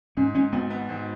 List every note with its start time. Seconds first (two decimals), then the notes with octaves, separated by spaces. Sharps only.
0.17 G#2 C#4
0.34 G#2 C#4
0.52 G#1 B3
0.70 B3
0.89 G#2